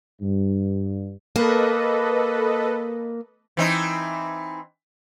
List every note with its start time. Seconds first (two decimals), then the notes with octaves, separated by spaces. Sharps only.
0.21 G2
1.36 A#3 A4 B4 D#5
3.57 E3 C4 D#4